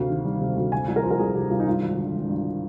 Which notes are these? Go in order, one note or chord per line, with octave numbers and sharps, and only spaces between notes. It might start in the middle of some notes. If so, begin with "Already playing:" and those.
Already playing: D2 C3 F5
D#3
G3
C3
D2
C3 G#5
C2
A#4
F3 C5
A#4
C2 G#4
C3 G4
C2 F4
D#4
G2 F4
G#1
D3
G#1
G2